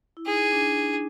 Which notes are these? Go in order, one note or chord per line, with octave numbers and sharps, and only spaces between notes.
E4
D#4 G#4
D4
D#4